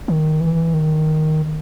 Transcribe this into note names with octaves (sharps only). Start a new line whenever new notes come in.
D#3
E3
D#3